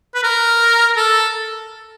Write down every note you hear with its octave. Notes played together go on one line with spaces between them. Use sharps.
B4
A#4
A4